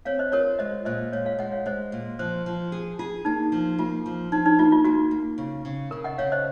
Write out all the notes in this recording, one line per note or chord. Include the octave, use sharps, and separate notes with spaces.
C4 C#5 F5
C5 D#5
F4 A#4 C#5
G#3 C5 D#5
A#2 C5 D#5
G#3 C#5 F5
C#5 F5
G#3 D#5 F#5
C#5 F5
G#3 C5 D#5
A#2
F3 C5
F3
G#4
F4 G#4
A#3 D#4
F3
A#3 F4
F3
F3 D#4
D#4
A#3 F4
F4
A#3 F#4
A#3
C#3
C#3
C#3 A#4
D#5 F#5
C#3 C#5 F5
C5 D#5